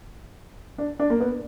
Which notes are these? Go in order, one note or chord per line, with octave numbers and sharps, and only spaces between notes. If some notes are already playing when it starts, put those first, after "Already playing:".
D4
D4
A#3
B3